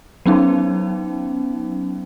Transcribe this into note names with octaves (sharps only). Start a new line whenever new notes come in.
F#3 B3 C#4 D#4